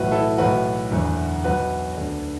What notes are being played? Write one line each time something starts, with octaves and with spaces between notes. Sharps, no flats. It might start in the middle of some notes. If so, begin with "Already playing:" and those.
Already playing: B1 A2 E3 F#4 B4
E4 A4
B1 A2 E3 F#4 B4
F#1 E2 D3
B1 B2 F#4 B4
D2 D3